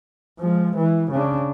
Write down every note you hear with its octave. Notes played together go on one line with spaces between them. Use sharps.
F3 G#3
E3
C#3 D4